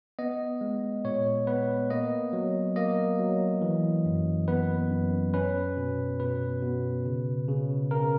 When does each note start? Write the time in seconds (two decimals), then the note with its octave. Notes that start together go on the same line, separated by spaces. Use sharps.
0.19 B3 D#5
0.61 G#3
1.04 A#2 C#5
1.47 B3 B4
1.90 A#3 D#5
2.33 F#3
2.76 A#3 D#5
3.19 F#3
3.62 E3
4.05 F#2
4.48 B3 B4
4.90 F#2
5.34 C#4 B4
5.77 B2
6.19 B2 B4
6.62 B2
7.06 C#3
7.48 C#3
7.91 C#3 A#4